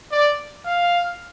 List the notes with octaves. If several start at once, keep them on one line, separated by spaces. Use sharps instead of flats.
D5
F5